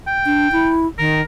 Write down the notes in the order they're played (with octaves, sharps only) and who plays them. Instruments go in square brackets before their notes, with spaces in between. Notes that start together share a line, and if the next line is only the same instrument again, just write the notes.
[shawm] G5
[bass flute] D4
E4
[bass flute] D#3 [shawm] A#4